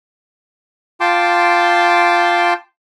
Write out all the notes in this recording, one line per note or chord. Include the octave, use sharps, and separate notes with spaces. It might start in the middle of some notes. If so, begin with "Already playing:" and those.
F4 G5 A5 C6 D6